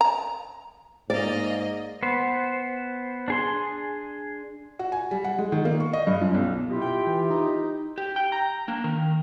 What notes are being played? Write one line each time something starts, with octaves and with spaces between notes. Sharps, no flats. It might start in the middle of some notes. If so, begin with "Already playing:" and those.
A#5
G#2 A#3 D5 D#5
B3 C5
D4 G#4 C6
F#4
G#5
G3
F#5
G#3
D#3
A#3
C#6
D#5
G2
F#2
B1
B2 E4 F4 G4
G5
E3
D#4
G4
G5
A#5
A#3 D4
D#3 A#4